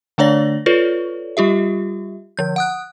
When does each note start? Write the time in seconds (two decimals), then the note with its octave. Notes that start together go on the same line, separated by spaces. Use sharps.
0.18 D3 A3 D4 C#5 D5 A#6
0.66 F4 A4 B4 C#5 D5
1.37 G3 F4 G4 E5
2.37 D3 F3 G6
2.56 F#5 D#6 F#6